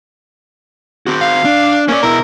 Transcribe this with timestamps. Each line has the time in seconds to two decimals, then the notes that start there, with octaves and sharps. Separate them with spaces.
1.07 C4 F#4
1.21 F5
1.45 D4
1.88 A#3 C#4 D5
2.03 B2 E4 A#4